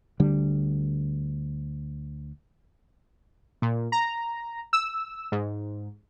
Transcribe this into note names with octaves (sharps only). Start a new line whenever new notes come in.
D2 D3 G3 D4
A#2
A#5
E6
G#2